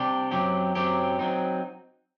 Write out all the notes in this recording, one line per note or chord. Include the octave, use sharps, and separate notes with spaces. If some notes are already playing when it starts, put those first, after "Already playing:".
Already playing: C3 G3 D4 G4
F#2 F#3 C4 G4
F#2 F#3 C4 G4
F#3 C4 D#4